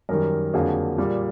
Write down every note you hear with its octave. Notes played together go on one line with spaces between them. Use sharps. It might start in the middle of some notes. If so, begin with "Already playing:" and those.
F#2 D#3 G3 A#4
F2 D3 F#3 A#3 G#4
A#2 G3 A#3